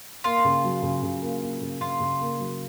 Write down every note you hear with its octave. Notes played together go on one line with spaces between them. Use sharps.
A#3 F4
C#3
F#3
C#3
C#3
A#3
A#3
C#3
C#3 F4
C#3
A#3
F#3